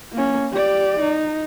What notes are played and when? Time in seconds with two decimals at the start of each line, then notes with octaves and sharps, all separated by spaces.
0.13 A#3 C#4
0.52 G4 D5
1.00 D#4